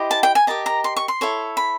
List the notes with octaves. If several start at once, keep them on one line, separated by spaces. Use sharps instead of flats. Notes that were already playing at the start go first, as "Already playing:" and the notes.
Already playing: E4 G4 C5 D#5
A5
G5
G#5
G4 A#4 D#5 A5
A#5
C6
C#6
C6
E4 A4 C#5
B5